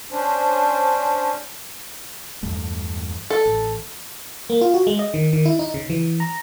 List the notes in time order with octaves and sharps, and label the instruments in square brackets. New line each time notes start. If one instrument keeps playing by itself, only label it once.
[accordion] C#4 D4 C5
[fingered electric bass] E2 G2 A3
[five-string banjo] A4
[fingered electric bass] A1
[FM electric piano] A#3
F4
F#4
G#3
D#5
D#3
D#3
E4
D#4
C#3
E3
A#5